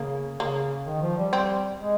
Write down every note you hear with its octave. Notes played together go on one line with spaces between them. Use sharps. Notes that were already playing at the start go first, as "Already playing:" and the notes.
Already playing: C#3 A#3
C#3 A#3
D#3
F3
G3
C4
G#3